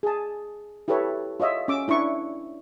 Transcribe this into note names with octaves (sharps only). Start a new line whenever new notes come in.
G#4 A5
E4 G4 A4 B4 C#5
F4 C#5 D#5 E5
C#4 D6 E6
D4 E4 D5 C#6